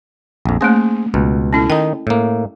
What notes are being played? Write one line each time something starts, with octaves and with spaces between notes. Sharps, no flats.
A#1 F2
A3 A#3 C#4 G#4 C5
C#2 B2
C#4 E4 A4
D#3 D#4 G5
A2 A#3